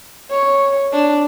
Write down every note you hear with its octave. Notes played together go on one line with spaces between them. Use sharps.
C#5
D4